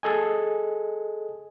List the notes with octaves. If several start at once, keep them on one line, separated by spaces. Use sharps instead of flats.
G#4 A4 D#5 G#5